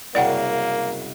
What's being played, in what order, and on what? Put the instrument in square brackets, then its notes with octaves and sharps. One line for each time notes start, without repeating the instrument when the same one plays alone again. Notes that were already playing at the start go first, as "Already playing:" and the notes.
[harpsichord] C2 F#2 C#3 [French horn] A#3 [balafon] D5 F#5 G5